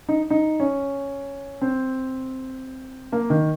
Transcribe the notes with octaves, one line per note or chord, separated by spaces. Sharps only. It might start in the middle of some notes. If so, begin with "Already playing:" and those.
D#4
D#4
C#4
C4
A#3
D#3